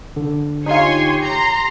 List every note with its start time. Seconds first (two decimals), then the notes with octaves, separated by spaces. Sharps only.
0.16 D3
0.66 D#4 F4 G4 C#5 G#5 C6
1.22 A#5 C6